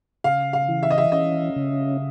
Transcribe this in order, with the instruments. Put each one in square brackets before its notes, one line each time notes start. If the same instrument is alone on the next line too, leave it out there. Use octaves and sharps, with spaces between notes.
[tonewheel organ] C#3 [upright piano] F5
[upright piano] F5
[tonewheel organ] E3
[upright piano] E5
D#5
E5
[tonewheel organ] C#4 [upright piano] D#5
[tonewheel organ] C#3